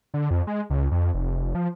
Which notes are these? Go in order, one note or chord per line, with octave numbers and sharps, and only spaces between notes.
D3
F2
G#3
C#2
F2
F1
F3